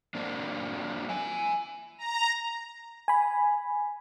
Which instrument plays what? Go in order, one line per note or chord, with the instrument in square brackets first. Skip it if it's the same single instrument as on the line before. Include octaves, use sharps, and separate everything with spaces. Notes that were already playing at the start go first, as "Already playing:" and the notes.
[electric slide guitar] F#3 A#3 C4 D4
E5 G#5
[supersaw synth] A#5
[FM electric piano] G#5 B5